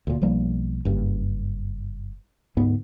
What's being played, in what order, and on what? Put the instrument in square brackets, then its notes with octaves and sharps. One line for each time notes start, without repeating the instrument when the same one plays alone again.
[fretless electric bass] D2 A#2
B1 F3 G3 A#3
F#1 G2
D2 G#2 B3